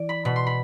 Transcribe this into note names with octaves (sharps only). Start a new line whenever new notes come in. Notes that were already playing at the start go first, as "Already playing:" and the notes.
Already playing: E3 D5
B5
B2 B5
C6
B5